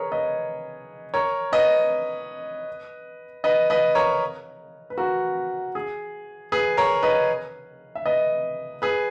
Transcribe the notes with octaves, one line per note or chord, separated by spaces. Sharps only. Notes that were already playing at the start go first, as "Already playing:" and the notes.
Already playing: G#4 A#4 B4 C#5
B4 D#5
A#4 C#5
B4 D#5
B4 D#5
B4 D#5
A#4 C#5
B4
F#4 A#4
G#4
G#4 B4
A#4 C#5
B4 D#5
E5
B4 D#5
G#4 B4